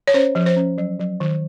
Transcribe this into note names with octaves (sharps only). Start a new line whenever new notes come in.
C#5
C#4 C5
F3
C5
C#4
F#3
F#3
D#3